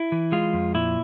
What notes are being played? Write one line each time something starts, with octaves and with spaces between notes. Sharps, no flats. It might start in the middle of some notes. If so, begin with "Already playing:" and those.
Already playing: E4
E3
G#3 F4
F2
A#2 E4